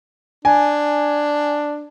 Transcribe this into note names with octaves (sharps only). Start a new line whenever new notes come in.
D4 G#5